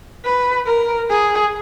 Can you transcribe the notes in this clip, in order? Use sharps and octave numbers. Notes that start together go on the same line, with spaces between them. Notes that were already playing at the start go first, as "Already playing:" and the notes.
B4
A#4
G#4